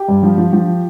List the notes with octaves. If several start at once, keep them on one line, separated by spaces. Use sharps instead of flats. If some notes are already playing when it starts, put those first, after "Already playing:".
Already playing: G4
G2
F3
F3
F3